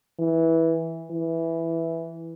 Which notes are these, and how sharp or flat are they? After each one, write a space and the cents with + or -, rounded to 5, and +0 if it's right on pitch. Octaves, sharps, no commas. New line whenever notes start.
E3 -10
E3 +0